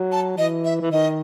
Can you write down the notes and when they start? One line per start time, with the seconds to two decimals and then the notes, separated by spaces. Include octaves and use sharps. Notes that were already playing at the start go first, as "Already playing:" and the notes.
Already playing: F#3
0.12 A5
0.38 E3 D#5
0.65 E5
0.81 E3
0.92 D#3 D#5